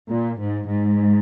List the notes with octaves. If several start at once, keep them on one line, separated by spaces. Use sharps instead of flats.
A#2
G#2
G#2